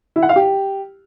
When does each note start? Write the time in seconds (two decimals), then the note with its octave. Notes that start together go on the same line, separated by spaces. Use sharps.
0.16 E4
0.22 F#5
0.29 F5
0.36 G4